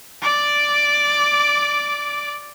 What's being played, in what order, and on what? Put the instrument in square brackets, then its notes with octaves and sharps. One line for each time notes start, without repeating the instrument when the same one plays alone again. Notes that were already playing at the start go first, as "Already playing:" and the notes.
[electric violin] D5 D6